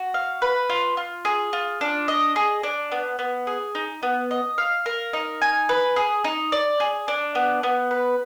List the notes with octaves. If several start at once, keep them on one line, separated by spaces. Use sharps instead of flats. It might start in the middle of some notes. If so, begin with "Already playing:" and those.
Already playing: F#4
F5
B4
F4
F4
G#4
F4
D4
D#5
G#4
D4
B3
B3
G#4
D#4
B3
D#5
F5
A#4
D#4
G#5
B4
G#4
D#4
D5
G#4
D4
B3
B3
B4